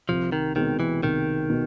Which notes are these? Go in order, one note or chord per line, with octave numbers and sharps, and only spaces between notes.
C2 F3
D#3
B2 D#3 G#3 C4
E3
C2 D#3
B2